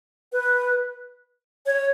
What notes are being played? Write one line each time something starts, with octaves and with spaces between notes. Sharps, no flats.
B4
C#5